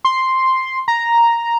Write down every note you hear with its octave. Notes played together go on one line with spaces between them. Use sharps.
C6
A#5